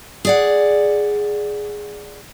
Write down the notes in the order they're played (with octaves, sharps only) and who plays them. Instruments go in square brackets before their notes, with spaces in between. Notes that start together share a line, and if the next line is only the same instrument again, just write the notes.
[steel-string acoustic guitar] G#4 D5 F#5